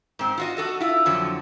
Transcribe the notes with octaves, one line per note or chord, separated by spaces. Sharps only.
G#2 C4
F4 F#4 D#5
F#4 A4 D#5
E4 F4
F2 D3 F3 F#3